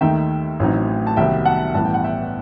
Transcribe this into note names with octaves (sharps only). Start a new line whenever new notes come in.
D#2 D#3 A3 D#4 E5 G5
A1 A2 F#3 C4 D#4
A5
C2 C3 D#3 F#3 B3 E5 G5
F#5 A5
A1 G2 E3 B3 A5
G5
F#5
E5 G5